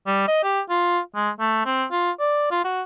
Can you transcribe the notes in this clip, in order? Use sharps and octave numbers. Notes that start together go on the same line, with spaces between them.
G3
D#5
G4
F4
G#3
A3
C4
F4
D5
F4
F#4